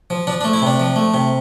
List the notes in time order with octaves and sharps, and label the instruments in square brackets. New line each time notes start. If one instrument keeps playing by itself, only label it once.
[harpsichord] F3
F3 D4
D4
A3
E4
C3 D4
F3
A3
C3